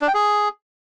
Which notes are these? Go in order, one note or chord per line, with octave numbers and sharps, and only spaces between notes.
D4
G5
G#4